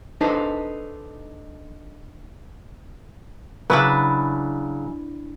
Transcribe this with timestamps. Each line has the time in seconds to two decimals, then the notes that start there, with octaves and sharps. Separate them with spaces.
0.21 D4 D#4 A4 B4 C5
3.70 C#3 F#3 D4 E4 B4